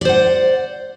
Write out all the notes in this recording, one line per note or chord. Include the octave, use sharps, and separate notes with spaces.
C5 D5 F#5